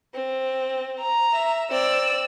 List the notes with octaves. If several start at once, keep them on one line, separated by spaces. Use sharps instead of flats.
C4
A#5
E5
C4 D5 E6